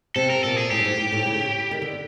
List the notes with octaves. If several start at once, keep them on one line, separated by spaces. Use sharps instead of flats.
C3 A4
A#4
A#2 A4
G#4
A2 G4
G2
G#2
A2
A2
C#3
D#3
D3